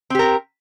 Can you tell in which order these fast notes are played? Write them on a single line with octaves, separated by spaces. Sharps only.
C4 G4 A#4